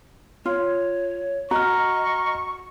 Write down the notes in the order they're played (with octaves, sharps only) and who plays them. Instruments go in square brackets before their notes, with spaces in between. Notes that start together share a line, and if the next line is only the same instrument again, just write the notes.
[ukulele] F4 [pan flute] C#5
[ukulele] F#4 [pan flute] D#5 [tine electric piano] A#5 F6 [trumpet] C#6